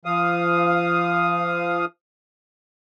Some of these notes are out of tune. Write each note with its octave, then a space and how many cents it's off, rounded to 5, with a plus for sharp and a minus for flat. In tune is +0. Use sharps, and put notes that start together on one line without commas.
F3 -30 F5 +0 D#6 +0